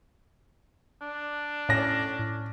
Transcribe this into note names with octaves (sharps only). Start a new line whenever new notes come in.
D4
A2 C#4 A#6